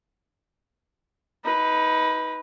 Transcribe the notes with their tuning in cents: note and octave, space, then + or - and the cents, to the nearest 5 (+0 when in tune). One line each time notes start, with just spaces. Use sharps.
D#4 +25 B4 +0